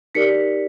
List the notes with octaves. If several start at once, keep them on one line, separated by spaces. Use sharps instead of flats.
D#4 G4 A#4 D5 B6 C#7